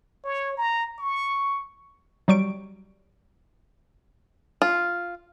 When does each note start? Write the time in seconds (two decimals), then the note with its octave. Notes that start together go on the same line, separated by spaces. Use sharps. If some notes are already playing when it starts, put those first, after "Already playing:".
0.24 C#5
0.57 A#5
0.99 C#6
2.28 F#3 G3 C#6 D7
4.62 F4